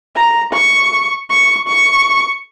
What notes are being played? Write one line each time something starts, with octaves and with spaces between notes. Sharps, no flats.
A#5
C#6
C#6
C#6